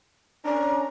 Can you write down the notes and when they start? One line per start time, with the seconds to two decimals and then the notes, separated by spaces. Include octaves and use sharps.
0.45 C#4 D4 A#5